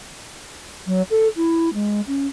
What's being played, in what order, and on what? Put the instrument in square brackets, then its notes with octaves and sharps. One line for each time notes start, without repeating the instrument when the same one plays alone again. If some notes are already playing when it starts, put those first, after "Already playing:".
[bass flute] F#3
A4
E4
G#3
C#4